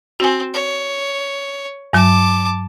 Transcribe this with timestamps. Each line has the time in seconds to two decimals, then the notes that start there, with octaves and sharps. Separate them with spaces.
0.20 C4 F#4 G#5
0.54 C#5
1.93 G2 F#3 A5 D6